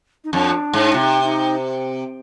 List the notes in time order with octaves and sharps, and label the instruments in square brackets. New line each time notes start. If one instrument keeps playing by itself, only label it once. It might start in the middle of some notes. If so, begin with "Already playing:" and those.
[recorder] D#4
[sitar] F2 [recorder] D4
[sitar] G#2
[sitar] C3 [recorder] D#4 F4
[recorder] D#4